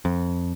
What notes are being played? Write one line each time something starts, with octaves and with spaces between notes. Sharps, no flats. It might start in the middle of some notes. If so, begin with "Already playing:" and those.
F2